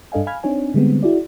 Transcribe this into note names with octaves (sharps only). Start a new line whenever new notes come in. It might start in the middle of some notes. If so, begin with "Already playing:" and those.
G2 D4 A4 D#5 F5 G#5
F5 G#5 B5 F6 G#6
C4 D4 D#4 C#5 G#5
D3 G3 G#3 B3 C4
E4 F#4 G#4 D5